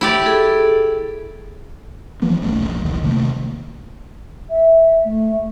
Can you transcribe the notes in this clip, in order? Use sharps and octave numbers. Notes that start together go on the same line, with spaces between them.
E4 G4 D5
G#4 A4
E3 F3 A#3 B3
E1 B1 A3 C#4
A#1
D1 B1 E2 D#3
C3 D#3 A3 A#3
E5
A3